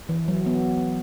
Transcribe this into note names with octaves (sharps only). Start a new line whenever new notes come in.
E3
F#3
B3